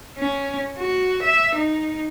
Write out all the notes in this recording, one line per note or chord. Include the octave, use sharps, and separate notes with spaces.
C#4
F#4
E5
D#4